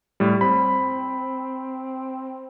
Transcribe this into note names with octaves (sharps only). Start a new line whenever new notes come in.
A2 G3
C4 B5